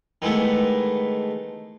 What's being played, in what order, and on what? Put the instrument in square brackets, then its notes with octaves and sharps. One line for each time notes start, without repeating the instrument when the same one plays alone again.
[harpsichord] D#3 E3 G#3 A3 B3